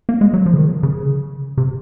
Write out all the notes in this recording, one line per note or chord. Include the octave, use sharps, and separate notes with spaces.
A#3
G#3
F#3
F3
C#3
D#3
C#3
C3